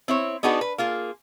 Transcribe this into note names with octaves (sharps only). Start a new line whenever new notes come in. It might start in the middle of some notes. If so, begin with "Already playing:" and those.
C4 E4 C#5
B3 D4 D#4 F#4 G#4 B4
B4
A#3 F4 G#4